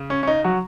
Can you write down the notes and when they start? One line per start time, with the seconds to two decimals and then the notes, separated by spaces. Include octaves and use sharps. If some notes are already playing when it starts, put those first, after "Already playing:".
Already playing: C#3
0.10 C#4
0.23 C#4
0.27 D#4
0.44 F#3 F#4